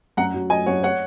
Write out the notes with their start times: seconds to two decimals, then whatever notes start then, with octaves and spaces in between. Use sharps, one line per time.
0.17 F#2 F#5 A#5
0.34 F#3
0.50 F#3 D#5 G#5
0.66 F#2 C#5 F#5
0.83 C#5 F#5